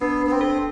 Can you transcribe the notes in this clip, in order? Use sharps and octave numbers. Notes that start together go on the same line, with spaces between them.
B3 D4
D4
B3
C4
A4